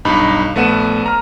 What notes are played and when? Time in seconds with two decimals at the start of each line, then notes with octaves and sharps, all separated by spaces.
0.05 B1 G2 D#4 B5
0.55 A#1 A3 B3 F#5 D#7 E7
1.06 A#5 F6